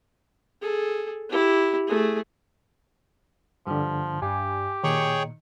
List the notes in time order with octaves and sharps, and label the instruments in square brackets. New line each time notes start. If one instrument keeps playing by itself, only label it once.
[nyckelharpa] G#4 A4
E4 G4
A3 G#4
[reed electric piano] G2 D3 [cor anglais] F3 [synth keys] G3
[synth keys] G2 D4 [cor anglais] G4 [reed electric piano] G#5
[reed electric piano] A#2 [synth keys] D#3 C#7 [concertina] G#4 C#5 G5